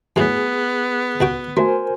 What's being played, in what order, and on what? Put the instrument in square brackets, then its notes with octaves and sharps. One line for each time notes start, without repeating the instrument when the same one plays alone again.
[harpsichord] F#2 A2 [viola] B3 [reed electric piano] G#4
[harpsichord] C#2 F#4 G5
[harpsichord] A3 [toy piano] F#4 [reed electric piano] A#4 C5 G#5